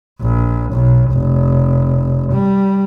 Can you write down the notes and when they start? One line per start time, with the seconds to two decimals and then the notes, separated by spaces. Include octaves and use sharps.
0.22 A#1
0.72 B1
1.13 F1
2.33 G3